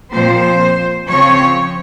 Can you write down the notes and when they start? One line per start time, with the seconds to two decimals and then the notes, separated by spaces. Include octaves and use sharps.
0.11 A#2 F3 C4 C5
1.08 C#3 F3 C4 C#5